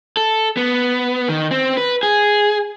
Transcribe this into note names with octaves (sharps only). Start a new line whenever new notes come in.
A4
B3
D#3
C4
B4
G#4